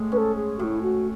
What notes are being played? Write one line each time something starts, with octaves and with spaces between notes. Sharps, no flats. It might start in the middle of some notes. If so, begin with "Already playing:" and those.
Already playing: A2 G#3
C#4 B4
A4
G#4
A2 E4 F#4
F#4